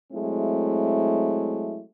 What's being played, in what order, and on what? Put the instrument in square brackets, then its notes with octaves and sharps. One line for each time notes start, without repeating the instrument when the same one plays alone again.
[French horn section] F#3 G#3 A3 C4 E4